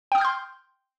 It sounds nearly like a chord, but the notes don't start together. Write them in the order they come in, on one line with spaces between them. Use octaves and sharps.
G5 D#6 F6 G6 C6